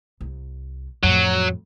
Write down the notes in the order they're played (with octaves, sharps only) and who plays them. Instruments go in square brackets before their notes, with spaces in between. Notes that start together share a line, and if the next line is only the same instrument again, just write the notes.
[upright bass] C2
[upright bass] F2 A2 [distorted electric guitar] F#3